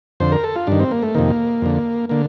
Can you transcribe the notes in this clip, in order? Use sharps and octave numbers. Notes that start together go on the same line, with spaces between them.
F2 D3 C5
A#4
A4
F4
G2 D#3 D4
C4
A#3
A3
F2 C3 D#3 A#3
F2 D3
D3 A#3